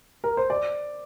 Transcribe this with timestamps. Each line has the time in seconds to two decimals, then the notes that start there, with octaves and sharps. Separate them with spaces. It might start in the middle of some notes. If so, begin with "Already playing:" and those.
0.24 A#4
0.37 C5
0.50 D5